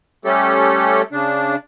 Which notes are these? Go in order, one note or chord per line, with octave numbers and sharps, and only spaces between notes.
G3 A3 C#4 G4 A4
C#3 D4